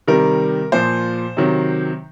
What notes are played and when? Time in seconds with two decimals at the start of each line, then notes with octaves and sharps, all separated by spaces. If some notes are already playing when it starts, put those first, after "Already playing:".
0.08 C3 D#3 G3 A#4
0.72 A#2 F3 C5
1.37 C3 D#3 F#3